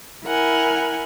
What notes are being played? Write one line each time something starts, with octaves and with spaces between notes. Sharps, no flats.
E4 A#4 F#5 G#5